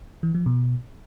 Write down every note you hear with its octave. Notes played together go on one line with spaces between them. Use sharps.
E3
F3
B2